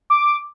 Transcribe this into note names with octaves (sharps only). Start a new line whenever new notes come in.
D6